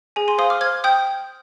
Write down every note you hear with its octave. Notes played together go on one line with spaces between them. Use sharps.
G#4 G#5
G#5 C6
C5 F5 C6 D#6
D6 F6
C5 F6 G#6
G5 D#6 G6